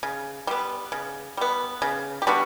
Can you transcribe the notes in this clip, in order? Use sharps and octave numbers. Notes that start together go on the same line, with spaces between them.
C#3
G3 B3
C#3
G3 B3
C#3
G4
G3 B3 D4 F#4